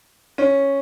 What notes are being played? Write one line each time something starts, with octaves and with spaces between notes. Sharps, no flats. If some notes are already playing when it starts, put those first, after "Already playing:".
C#4